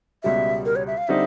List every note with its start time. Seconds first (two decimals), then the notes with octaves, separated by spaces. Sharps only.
0.24 C#2 B2 G3 E5
0.66 A#4
0.76 C#5
0.87 E5
0.98 F5
1.08 D3 G3 C4 D#4 E5